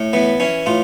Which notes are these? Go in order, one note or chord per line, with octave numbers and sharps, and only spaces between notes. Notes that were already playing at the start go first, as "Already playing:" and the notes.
Already playing: A2
E3 B3
E3 C#4
A2 F4